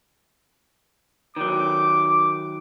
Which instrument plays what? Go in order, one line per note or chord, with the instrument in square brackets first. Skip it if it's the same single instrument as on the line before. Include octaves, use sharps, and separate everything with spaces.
[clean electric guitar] D#3 F#3 [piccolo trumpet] D6